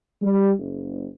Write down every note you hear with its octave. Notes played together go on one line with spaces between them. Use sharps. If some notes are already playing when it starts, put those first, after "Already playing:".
G3
F#1